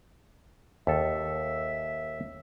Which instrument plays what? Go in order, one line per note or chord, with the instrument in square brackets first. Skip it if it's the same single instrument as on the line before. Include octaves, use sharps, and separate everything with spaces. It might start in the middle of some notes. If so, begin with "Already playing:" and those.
[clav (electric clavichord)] D#2 A4 [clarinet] E5